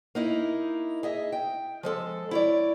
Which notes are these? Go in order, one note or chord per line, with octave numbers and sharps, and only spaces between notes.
A#3 D#4 E4
G#4 D#5 E5
G5
F3 G#3 A4
E4 C#5 D5